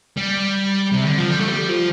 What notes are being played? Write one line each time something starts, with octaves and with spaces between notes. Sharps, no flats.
G3
C3
D3
F3
G3
A3
G3
F3